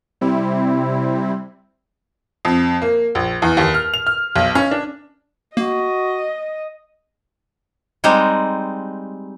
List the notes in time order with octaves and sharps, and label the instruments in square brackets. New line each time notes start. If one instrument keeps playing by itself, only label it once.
[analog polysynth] C3 G3 C4 E4
[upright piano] F2
A#3
A#1
E2
D#2
F6
F7
F6
B1
C#4
D4
[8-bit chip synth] A#3 [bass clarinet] F#4 [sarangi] D#5
[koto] G3 G#3 C4 D#4